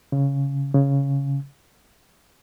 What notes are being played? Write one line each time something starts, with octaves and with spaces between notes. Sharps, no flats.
C#3
C#3